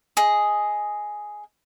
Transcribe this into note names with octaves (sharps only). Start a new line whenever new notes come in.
G#4 D#5